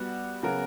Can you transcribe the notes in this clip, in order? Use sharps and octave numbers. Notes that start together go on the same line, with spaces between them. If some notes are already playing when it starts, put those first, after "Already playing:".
Already playing: G3 B3 F#4
C#3 F#3 B3 F#4 A#4